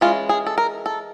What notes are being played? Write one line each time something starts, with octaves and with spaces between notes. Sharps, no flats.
E3 G#3 C#4 F4
G#4
A4
A#4
A4